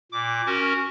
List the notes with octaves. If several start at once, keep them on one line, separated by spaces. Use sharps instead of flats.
A#2 D6
C#4 F#4 A#4